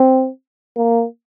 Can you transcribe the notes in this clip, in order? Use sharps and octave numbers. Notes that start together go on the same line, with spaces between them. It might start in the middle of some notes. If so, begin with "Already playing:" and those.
Already playing: C4
A#3